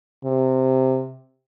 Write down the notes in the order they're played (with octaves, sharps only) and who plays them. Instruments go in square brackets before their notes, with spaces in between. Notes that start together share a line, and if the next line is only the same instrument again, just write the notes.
[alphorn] C3